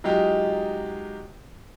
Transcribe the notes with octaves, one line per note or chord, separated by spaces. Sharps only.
F#3 G#3 D#4 F4 G4